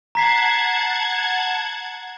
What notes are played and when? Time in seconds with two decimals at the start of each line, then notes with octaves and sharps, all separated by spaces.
0.15 F#5 A5 A#5 G#6 B6 C7